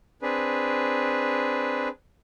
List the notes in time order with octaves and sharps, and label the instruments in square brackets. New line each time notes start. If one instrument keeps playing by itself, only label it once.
[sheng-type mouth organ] C4 D4 G#4 B4